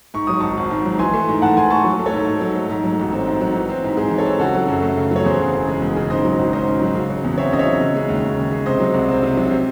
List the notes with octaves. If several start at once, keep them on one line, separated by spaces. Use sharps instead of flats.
G#2 C#6
F#3 D#6
G#1 A5 C#6
G#1
G#2
F#3
E3 G#5 C6
A3
G#2
G#2 F#5 A5
E3 G#5 C6
A3 A5 C#6
F#3
A3
A4 C#5
G#2
G#2
F#3
A3
G#2
F#3
A1
C4
G#2
F#3
E3
C4
G#2
G#2 G#4 C5
E3
A4 C#5
C4
C#3 F#4 A4
F#3
F#2
A3
C#3
F#3 C#5
E2 G#4 C5
C#3
E1
G#3
E2
C#3
G#2 C5 D#5
F#3
G#1
C#4 C5 D#5
G#2
F#3
C#3
F#3
E2
C4 C#5 E5
C#3 D#5
C#5 E5
F#3
C#3
G#3
D#2
D#2
C#3
G#3
C3 C5 D#5
F#3
C2
C4
C3
F#3
C3